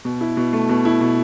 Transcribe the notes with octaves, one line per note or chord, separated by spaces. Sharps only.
B2
E4
B2
A3
B2
E4
B2